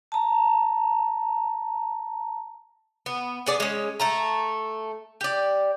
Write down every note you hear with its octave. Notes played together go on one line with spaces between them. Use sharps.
A5 A#5
B3
B3 G#4 D5
G#3 C#4
A3 A5 A#5
G4 D5